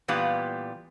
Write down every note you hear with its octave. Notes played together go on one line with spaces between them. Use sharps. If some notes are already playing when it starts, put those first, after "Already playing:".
A#2 E3 G3 B3 F4